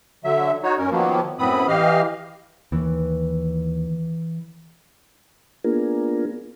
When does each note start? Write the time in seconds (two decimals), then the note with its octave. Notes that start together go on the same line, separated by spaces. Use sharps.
0.24 D3 F#3 E5
0.63 D#4 F#4 C#5
0.78 F#2 C#4 A#4
0.91 D#3 F3 F#3 A#3 B3
1.39 F#2 A2 B3 C4 B5 D#6
1.68 E3 G4 D#5 F5 F6
2.72 D#2 E3
5.64 A#3 B3 D4 F4 G#4 A#4